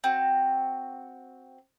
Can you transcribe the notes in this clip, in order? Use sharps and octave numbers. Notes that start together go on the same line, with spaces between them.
C4 F#4